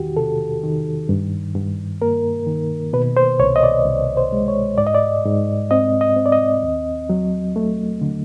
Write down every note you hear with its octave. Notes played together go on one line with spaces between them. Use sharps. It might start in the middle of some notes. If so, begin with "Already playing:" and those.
Already playing: E2 D#3 F#4 G4
C3 A4
D#3
G2
G2
A#3 A#4
D#3
B2 B4
C5
C2 C#5
D#5
D5
C2
C5
G#3
C#5
G#2 D5
D#5
D5
G#2
C4 D#5
D#5
C4
D5
D#5
D#2
F#3
A3
D3